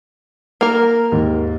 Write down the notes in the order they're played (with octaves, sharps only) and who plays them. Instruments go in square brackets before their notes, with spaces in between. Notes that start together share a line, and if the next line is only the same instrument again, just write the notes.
[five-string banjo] A#3 A#4
[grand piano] D#2 G#2